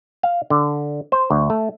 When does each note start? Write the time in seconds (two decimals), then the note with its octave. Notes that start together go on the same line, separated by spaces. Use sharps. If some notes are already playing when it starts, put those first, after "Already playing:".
0.23 F5
0.50 D3
1.12 C5
1.30 D2
1.50 A3